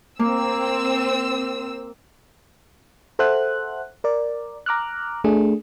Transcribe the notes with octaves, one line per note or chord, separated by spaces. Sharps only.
A#3 C4 E6
A4 C5 E5 F#5 F#6
A#4 D5
A#5 D6 F6 F#6
A3 D4 G#4